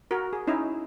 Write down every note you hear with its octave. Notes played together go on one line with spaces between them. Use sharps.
F#4 A#4
G#4
C#4 D#4 E4